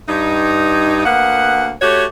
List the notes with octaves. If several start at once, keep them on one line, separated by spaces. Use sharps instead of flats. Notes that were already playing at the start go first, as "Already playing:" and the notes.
G2 D#4
D2 A#3 B3 F#5
A3 F#4 G4 C#5